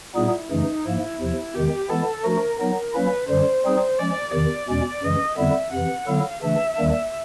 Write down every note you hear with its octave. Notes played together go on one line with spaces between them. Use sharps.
A#2 G3 B3 D#4 E4 G#4
F#2 C#3 E3 A3 D#4
G#2 F3 A#3 E4
E2 C3 F3
E2 C3 D#3 G#3 G4
E3 G#3 B3 E4 A4
F3 A3 D4 F#4 A#4
F#3 B3 D#4 A#4
F#3 A#3 C#4 E4 B4
F#2 D3 G3 C5
G3 C4 D#4 G#4
F3 G#3 C#4 D5
E2 C3 D#3 D5
E2 B2 G#3 C#4
F#2 C#3 E3 G#3 D#5
F2 D3 G3 B3 E4 E5
F2 C3 E3 F#5
D3 F#3 B3 E4 A4 F5
C#3 E3 A3 D4 E5
D#2 D#3 G3 A#3 D4